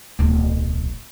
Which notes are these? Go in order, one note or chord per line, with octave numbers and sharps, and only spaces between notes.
D1 B1